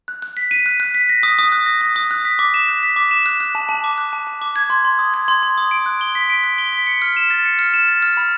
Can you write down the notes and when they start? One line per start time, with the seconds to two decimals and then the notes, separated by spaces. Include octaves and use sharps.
0.08 F#6
0.22 F#6
0.37 B6
0.51 D#7
0.66 F#6
0.80 F#6
0.95 B6
1.09 A#6
1.23 D#6
1.39 D#6
1.52 F#6
1.66 A#6
1.81 D#6
1.96 D#6
2.11 F#6
2.25 B6
2.39 D6
2.54 E7
2.68 F#6
2.83 B6
2.96 D6
3.11 E7
3.26 F#6
3.40 F#6
3.55 A5
3.69 A5
3.84 D6
3.98 F#6
4.13 A5
4.27 A5
4.42 D6
4.56 G#6
4.70 C6
4.85 C6
4.99 D#6
5.14 G#6
5.28 C6
5.43 C6
5.58 D#6
5.71 D7
5.86 F#6
6.01 G7
6.15 B6
6.30 D7
6.44 F#6
6.58 G7
6.73 B6
6.87 C#7
7.02 F6
7.17 E7
7.30 A6
7.45 C#7
7.59 F6
7.74 E7
7.88 A6
8.02 F6
8.17 B5